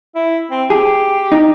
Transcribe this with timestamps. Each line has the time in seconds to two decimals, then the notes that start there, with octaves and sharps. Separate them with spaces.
0.16 E4
0.51 C4
0.70 G4 G#4
1.32 D#4